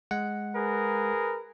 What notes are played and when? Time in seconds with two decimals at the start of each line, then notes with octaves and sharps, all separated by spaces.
0.11 G#3 F#5
0.56 G#4 A#4 B4